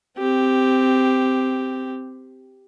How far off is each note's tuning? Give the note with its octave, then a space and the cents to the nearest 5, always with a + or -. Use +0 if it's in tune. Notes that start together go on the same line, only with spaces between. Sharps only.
C4 -15 G4 +0